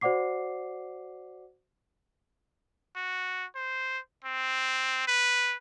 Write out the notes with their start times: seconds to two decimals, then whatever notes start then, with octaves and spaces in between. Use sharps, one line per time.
0.01 F#4 C5 D5 F#5 D6 C7
2.96 F#4
3.55 C5
4.24 C4
5.07 B4